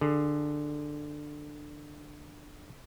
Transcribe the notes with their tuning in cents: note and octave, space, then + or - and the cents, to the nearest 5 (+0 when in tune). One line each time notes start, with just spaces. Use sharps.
D3 +15 G#4 +0